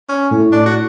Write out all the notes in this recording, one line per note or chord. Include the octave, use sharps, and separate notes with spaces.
C#4
A2
D4
F#4